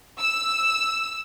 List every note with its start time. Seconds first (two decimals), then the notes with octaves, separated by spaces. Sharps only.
0.20 E6